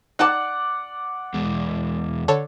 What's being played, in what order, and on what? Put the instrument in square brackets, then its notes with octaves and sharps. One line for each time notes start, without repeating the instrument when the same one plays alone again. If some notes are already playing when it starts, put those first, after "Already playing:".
[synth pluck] D#4 G5 A5 [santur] D5 F#5
[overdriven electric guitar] E2 G#3
[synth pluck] D3 A4 C#5